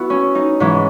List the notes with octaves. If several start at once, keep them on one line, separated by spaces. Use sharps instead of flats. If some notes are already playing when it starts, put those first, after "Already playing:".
Already playing: B3 E4 F#4
C#4
D#4
G#2 E3 C#4